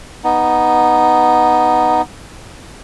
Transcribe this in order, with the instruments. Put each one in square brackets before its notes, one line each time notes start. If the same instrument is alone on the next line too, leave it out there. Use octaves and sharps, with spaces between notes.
[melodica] B3 D#4